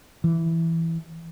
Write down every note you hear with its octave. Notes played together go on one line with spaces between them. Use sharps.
E3